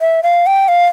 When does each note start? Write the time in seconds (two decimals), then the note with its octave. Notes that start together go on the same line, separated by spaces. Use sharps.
0.01 E5
0.23 F5
0.46 G5
0.68 F5